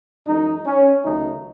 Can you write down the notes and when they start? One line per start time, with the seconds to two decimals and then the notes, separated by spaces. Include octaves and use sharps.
0.27 F#2 E3 G#3 D#4
0.66 C#4
1.04 C#2 C3 D#3 F#3 A3 D#4